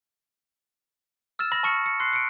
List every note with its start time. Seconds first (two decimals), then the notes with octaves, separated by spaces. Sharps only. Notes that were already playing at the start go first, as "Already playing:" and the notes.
1.39 E6 F6 A6 E7
1.52 B5 F6 A#6
1.63 A5 C#6 F6 C#7
1.86 C#7
2.00 C6 F#6 C7
2.13 C#7 D7